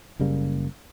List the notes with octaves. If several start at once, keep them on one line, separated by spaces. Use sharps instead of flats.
F#1 C#3 G3 A#3